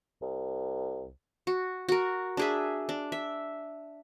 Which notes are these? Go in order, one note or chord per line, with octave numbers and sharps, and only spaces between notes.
C2
F#4
F#4 A#4
D4 G#4 E5
D4
E5